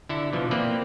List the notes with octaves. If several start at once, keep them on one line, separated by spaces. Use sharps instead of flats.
D3 E4 A4
B2 E3 F3
A#3 C4 B4 D5